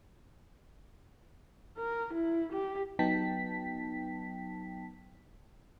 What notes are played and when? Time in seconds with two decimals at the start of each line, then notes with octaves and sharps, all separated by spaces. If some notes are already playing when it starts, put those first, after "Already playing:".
1.78 A#4
2.13 E4
2.52 G4
2.99 F#3 B3 D#4 G5 A5 B6